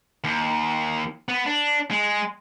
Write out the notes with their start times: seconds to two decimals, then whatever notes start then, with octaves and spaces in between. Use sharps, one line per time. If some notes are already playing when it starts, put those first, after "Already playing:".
0.24 D#2
1.29 B3
1.46 D4
1.91 G#3